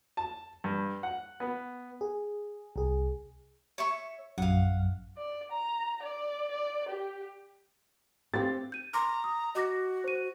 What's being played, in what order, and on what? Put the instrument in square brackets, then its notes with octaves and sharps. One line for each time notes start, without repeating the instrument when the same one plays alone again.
[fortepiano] A5
G2
F#5
B3
[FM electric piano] G#4
C2 G#4
[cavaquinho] C#5 E5 C#6
[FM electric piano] A#1 F#2 [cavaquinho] F5 F#5
[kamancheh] D5
A#5
D5
D5
G4
[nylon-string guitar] C4 G4 [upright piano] A6
[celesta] G6 D#7
[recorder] A#5 [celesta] C6 D6 F6
[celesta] D#6
[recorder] F#4 [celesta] D#5 D6 A#6
[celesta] C5 D#7